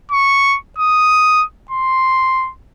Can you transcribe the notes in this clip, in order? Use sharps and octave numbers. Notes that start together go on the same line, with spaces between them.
C#6
D#6
C6